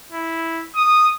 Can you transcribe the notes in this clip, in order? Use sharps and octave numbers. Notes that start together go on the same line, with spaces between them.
E4
D#6